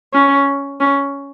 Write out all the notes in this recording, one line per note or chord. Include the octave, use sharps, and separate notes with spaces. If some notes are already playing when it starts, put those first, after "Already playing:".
C#4
C#4